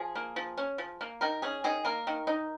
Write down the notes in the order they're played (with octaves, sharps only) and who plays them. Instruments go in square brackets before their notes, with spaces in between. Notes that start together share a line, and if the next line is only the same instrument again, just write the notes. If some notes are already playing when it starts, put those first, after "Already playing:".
Already playing: [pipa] F3 G#4
A#3
F3
C#4
F3
A#3
D#3 A#4
C#4 G#4
D#3 G#4
A#3 A#4
D#3
D#4